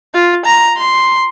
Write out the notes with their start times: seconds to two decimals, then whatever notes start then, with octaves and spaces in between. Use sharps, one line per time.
0.15 F4
0.46 A#5
0.77 C6